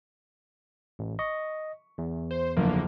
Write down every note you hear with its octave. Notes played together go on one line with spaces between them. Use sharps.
A1
D#5 C#6
E2
C5
F#1 D3 F3 A#3 F4